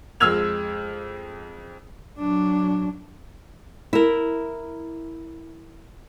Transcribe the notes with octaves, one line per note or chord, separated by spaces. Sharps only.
F2 G#3 E6 F6 G#6 F7
F#3 D4
E4 A#4